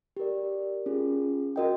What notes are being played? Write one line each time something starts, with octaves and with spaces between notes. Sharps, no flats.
G4 A#4 D5
C#4 F4 G#4
F#4 A#4 D#5 G5